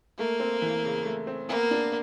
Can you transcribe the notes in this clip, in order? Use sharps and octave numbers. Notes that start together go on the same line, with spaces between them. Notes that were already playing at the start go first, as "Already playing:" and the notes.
A3 A#3
C4
E3
C#3
A3
C4
A#3 B3
D4